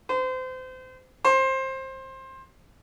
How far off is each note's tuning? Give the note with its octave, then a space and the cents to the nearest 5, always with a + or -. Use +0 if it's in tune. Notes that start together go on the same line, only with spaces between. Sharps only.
C5 -30
C5 +20